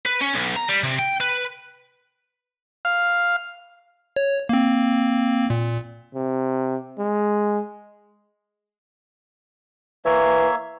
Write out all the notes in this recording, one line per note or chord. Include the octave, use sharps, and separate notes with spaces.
B4
C#4
B1
A#5
G3
C3
G5
B4
F5
C#5
A#3 C4
A#2
C3
G#3
E3 A#3 C#5 E5